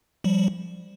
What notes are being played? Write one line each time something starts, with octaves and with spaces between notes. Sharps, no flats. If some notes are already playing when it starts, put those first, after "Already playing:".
F3 G3